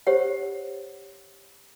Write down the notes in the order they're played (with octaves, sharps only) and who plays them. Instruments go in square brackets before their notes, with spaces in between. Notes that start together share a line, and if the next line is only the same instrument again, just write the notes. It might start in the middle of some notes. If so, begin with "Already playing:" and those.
[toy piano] G4 C5 C#5 F#5